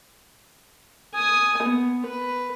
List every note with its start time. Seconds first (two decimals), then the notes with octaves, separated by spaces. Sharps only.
1.15 G#5 D#6
1.63 B3
2.06 B4